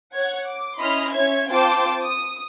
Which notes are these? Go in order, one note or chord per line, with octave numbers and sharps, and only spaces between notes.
C#5 F#5 G#6
D6
C#4 E4 D#5 B5 C6 F6
C#4 C#5 E5 G#6
C4 F4 C5 G5 A5 D6
D#6